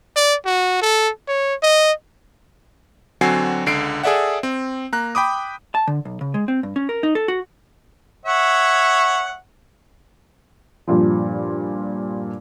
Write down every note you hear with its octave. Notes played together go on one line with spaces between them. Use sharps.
D5
F#4
A4
C#5
D#5
D3 F#3 C4 F#4 G#5 C7
C#2 D3 C7 D7
G#4 A4 D5 E5 F#5
C4
A#3 A#5 F#6
G5 B5 D6 D#6
A5
D3
B1
C#3
G#3
C4
G2
C#4
A#4
D#4
A4
F#4
C#5 E5 F#5
G2 A#2 F3